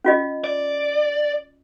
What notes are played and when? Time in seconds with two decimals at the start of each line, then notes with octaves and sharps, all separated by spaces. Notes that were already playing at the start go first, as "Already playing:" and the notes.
0.05 C#4 F4 D#5
0.44 D5